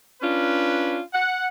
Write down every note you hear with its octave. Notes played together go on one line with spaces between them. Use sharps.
C#4 D4 F4 B4
F#5